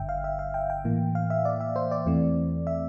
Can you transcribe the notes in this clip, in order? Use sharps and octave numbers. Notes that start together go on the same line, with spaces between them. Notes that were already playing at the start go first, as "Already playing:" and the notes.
Already playing: G1 G2 D3 E5 G5
F5
E5
F5
G5
G5
A2 E3 A#3
F5
E5
D5
E5
C5
D5
E2 E3 A3 C4
E5